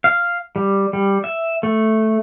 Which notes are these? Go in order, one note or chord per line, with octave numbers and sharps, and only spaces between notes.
F5
G3
G3
E5
A3